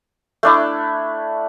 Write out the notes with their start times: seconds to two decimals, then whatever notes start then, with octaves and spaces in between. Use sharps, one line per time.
0.43 A3 D4 E4